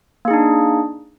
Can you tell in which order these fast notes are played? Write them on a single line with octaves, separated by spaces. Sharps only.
A#3 G#4 D#4 D4